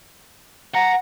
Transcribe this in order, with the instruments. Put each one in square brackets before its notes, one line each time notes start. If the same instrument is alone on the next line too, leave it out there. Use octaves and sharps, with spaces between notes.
[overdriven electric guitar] F#5 [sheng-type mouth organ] A#5